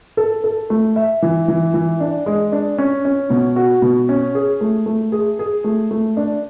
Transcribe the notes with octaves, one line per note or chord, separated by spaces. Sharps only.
A4
A4
A3
E5
E3
E3
E3
D4
G#3
D4
C#4
C#4
B2
F#4
B2
C#4
G#4
A3
A3
G#4
G#4
A3
A3
D4